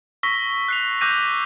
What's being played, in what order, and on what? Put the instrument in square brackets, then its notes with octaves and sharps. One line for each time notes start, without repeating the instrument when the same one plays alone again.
[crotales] C#6 E6 A#6 B6 G7
F#6 C7 F7
D6 E6 F#6 G6 A#6 D#7